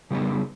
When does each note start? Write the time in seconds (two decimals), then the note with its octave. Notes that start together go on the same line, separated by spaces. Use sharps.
0.11 C#3 G3 B3